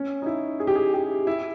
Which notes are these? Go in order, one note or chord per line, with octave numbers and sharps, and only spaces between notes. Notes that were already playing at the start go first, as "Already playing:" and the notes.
Already playing: C#4
D#4
E4
G#4
G4
G#4
G4
E4